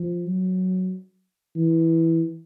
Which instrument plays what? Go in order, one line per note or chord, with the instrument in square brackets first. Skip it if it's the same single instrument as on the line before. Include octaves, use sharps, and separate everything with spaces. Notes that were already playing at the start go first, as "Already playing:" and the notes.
Already playing: [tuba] F3
F#3
E3